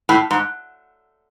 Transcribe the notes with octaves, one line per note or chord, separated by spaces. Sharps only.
A2
G#2